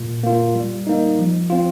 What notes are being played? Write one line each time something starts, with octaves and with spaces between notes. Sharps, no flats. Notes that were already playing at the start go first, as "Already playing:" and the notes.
Already playing: A#2
A#3 F4
G3
A#3 D#4
F3
C4 F4